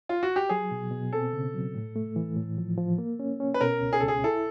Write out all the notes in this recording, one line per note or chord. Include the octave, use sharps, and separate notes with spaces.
F4
F#4
G4
F#3 G#4
B2
B2
C4 A4
C#3
F#3
A2
A3
E3
A2
F3
F3
A#3
C#4
C#4
B4
B2 A#4
C#2
G#4
C#2 A4
G#4
E4 A4